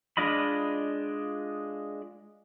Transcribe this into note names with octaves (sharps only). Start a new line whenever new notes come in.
G#3 D4 F4 D#5 B5